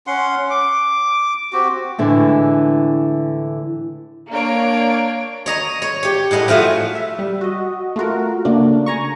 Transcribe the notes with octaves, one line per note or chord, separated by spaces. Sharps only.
C#4 F#5 C6
D6
C4 F#4 G4
A2 D3 E3 G#3
A#3 D4 C#5 D5 D7
C#5 D#5 A#5
C#5
G4 C#5
A2 G#3 D#5 F#5
F3 A3 F4 F#4
E5
G3
F#4 D#5
A3 F4 F#4 A#4
C#3 A3 A#3 D4
G#5 A#5 C#6